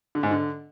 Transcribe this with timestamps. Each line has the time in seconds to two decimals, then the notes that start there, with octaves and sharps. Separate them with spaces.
0.15 D3
0.23 G#2
0.31 D3